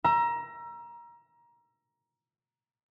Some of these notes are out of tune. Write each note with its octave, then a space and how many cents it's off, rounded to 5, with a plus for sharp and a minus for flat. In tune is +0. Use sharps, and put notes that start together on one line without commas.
A#5 +20 E6 +30